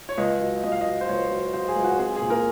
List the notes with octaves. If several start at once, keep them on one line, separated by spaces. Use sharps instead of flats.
C#5
C#2 D#5
F#3
C#2 D#5
F5
F#3 D#5
C5
C#2 C#5
F#3
F#3 C5
G#4
C#2
F#4
C4 G#4
G#4
A#2
A#4